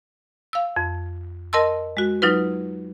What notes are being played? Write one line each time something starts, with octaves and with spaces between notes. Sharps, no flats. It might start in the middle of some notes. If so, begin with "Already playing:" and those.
F5 E6
F2
A#4 D#5 A5 C6 E6
G#3 F#4
F#3 D#4 F4 B4